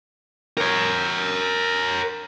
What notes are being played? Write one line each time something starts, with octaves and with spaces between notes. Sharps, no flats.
A#4 C#5